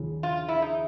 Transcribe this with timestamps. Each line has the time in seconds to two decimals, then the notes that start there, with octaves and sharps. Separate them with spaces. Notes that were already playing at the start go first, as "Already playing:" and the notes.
Already playing: D#2 C#3 F3
0.23 F4
0.48 E4
0.62 D#4